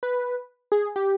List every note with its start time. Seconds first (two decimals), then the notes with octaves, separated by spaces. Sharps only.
0.03 B4
0.72 G#4
0.96 G4